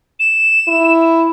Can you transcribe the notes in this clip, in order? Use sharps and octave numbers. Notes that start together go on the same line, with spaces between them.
E7
E4